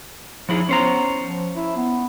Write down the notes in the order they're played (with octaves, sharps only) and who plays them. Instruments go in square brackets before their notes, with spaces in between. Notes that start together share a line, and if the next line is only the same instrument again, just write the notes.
[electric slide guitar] F3 E4 G#4 [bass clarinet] D#4
[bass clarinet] B3 [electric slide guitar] C#4 C5 A#5
[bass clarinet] F3
E4
B3